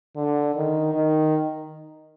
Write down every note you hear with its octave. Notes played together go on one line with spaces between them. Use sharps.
D3
D#3
D#3